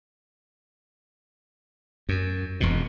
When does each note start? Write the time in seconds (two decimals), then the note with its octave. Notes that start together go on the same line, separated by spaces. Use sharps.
2.09 F#2
2.60 E1 F2 B2